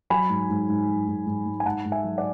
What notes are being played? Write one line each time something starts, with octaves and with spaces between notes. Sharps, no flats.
F#3 G#5 B5
G#2
G#2
G#2
F#3
G#2
G#2
G#2
G#5
G#2 F#5 A5
G#2
E5 G#5
F#3
D5 F#5